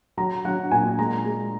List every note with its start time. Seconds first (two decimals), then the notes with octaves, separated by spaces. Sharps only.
0.17 F#3 A#5
0.45 F#3 F#5
0.71 A#2 G#5
0.99 G#3 A#5
1.25 G#3